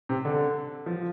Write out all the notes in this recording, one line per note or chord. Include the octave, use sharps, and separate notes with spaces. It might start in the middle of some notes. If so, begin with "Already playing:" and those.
C3
D3
F3